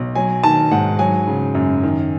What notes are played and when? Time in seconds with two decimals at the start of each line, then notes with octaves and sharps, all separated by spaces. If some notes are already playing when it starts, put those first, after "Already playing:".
Already playing: B1
0.15 F#3 G#5
0.44 D#3 A5
0.71 G#2 F#5
0.99 F#3 G#5
1.28 C#3
1.55 F#2
1.83 D#3